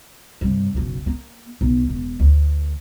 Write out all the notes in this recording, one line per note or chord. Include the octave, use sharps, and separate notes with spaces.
G2 C3
F#1 B1
A#3
B1
E1
D2